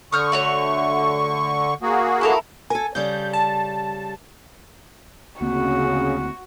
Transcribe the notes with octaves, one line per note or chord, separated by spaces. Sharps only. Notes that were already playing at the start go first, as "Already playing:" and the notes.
D3 C#6 D#6 F6 G6
A3 F#4 C#5
A#3 F#4 G#4
E4 A4 A#4
A4 A#4 G#5
C#3 G3 A4 G6
A5
D2 C#3 A#3 C4 F#4